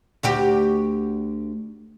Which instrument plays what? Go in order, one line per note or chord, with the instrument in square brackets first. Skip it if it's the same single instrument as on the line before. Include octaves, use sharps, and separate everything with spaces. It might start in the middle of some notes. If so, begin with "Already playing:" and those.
[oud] D2 F#4 G4